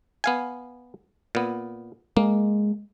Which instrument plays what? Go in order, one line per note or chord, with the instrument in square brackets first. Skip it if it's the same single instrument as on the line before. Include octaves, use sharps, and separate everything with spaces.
[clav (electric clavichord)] B3 F5 G#5
A#2 B3
[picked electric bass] G#3 [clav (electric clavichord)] A#3